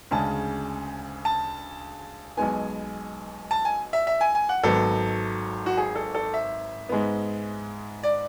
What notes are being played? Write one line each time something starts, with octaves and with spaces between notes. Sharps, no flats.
D2 C#3 G#3 C#4 A5
A5
B1 B2 G#3 B3 G#5
A5
G#5
E5
E5
G#5
G#5
F#5
G#1 G#2 F#3 B3 A4
F#4
G#4
A4
A4
E5
G#2 G#3 B3
D5